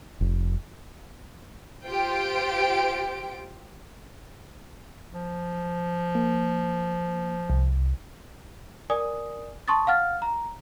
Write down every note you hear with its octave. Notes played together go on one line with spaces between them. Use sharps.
F1
F4 G4 C5 G5 D7
F3
A#3
C2
A#4 D5 G#5 D#6
A5 C6 C#6 D#6 A6
F5 F#5 F6 A6
A#5